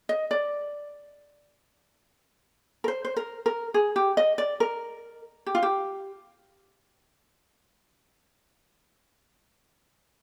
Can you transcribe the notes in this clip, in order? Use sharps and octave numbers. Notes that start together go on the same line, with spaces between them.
D#5
D5
A#4
C5
C5
A#4
A#4
G#4
G4
D#5
D5
A#4
G4
F4
G4